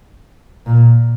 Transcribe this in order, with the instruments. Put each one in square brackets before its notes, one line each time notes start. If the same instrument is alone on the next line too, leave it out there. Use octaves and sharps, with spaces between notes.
[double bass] A#2